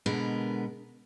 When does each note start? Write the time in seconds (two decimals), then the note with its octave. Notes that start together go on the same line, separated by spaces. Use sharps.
0.06 B2 D3 G#3 B3 A#4